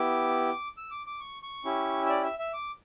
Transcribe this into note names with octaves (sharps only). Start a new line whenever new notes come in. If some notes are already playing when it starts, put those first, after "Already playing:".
Already playing: B3 E4 G4 D6
E6
D6
D6
C#6
C#6
C#4 E4 G4
E5
D5
E5
E5
D6